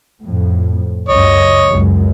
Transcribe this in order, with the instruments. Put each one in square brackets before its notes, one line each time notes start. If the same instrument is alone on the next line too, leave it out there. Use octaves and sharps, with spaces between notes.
[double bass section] F2 A2
[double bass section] C#2 F#2 [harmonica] C#5 D#5
[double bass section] C#2 F#2 G#3